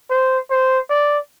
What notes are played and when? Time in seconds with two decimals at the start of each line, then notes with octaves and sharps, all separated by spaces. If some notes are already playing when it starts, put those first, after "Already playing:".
0.10 C5
0.50 C5
0.90 D5